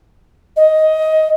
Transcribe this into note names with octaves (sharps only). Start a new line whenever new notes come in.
D#5